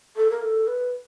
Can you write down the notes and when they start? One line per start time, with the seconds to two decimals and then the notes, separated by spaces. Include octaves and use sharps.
0.17 A4
0.30 A#4
0.42 A4
0.67 B4